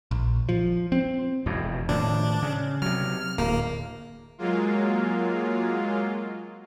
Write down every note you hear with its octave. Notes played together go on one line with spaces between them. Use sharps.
A#1
F3
C4
E1 F2 B2
A2 D#3 F3 D4
C#3
C3 F#3 F6
D1 A#3
F#3 G#3 A#3 F4